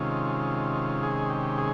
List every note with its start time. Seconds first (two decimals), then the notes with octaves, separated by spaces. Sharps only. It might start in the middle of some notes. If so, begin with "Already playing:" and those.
Already playing: C3 D#3 G#3 C#4 F4
1.03 G#4
1.30 G4
1.58 G#4